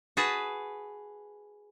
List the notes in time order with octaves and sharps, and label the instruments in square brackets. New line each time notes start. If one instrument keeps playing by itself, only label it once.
[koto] F#4 G#4 B4 A5